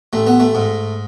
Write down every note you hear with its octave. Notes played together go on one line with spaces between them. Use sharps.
A1 A3
B3
A3
G#2